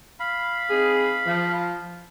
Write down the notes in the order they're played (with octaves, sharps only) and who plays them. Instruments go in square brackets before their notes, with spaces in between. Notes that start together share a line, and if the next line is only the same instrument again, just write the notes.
[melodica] F5 B5
[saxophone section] C4 D#4 G#4
F3